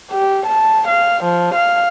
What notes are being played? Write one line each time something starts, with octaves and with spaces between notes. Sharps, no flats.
G4
A5
F5
F3
F5